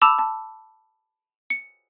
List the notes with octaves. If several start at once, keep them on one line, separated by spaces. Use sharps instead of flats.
A5 B5 D6 E6 E7 F7
A5
C#7